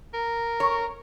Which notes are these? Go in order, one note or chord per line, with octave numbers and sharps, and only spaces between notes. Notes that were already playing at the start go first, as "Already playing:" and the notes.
A#4
C#5